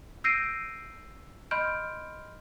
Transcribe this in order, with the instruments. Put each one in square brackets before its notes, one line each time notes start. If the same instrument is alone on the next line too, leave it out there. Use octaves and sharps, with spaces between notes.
[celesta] E6 G6 A#6 C7 D7 D#7
D#5 B5 C6 F6 G6 D7